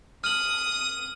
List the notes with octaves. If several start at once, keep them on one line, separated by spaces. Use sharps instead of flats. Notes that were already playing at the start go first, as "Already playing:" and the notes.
D#6 F6 F#7